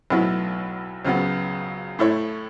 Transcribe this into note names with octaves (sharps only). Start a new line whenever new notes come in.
B1 A2 F#3 B3 E4
C#2 C#3 F#3 B3
A2 A3 E4 C#5